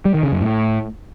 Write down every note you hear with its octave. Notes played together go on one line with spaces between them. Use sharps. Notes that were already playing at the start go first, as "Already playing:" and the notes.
G3
D#3
C#3
F#2
A2